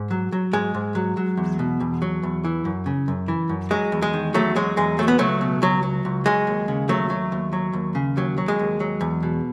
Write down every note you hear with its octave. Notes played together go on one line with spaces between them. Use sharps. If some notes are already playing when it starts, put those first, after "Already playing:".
Already playing: G#2
F#3
F#3
G#2 G#3
G#2
F#3
F#3
E2
B2
E2
F#3
E2
E3
F#2
C#3
F#2
E3
F#2
F#3 G#3
E2
G#3
D#3
E2 F#3 A3
F#3 G#3
E2 G#3
F#3 A3
B3
C#2 F#3 A3
B2
C#2 F#3
F#3
C#2
F#3 G#3
D#2
C#3
D#2 F#3 A3
F#3
D#2
F#3
D#2
C#3
D#2 F#3
F#3
G#3
D#2
F#3
E2
B2